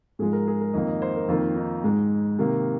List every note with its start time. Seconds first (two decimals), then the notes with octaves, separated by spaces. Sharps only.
0.19 G#2 F3 G#3 G#4
0.33 A#4
0.47 G#4
0.61 A#4
0.74 F2 D#3 A#3 D#5
0.87 D#5
1.02 C5
1.16 A#4
1.28 F2 D#3 A#3 F4
1.56 D#4
1.84 G#2 G#3
2.39 C3 D#3 A#3